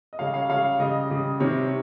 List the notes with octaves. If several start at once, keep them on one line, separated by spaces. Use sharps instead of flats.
D#5
C#3 G3 C#5 F5
C#5 F5
C#3 G3 C#5 F5
C#3 G3 D#5
C#3 G3
C3 D#3 G3 C#5